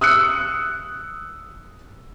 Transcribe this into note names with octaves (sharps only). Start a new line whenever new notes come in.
D#6 E6 F#6 C#7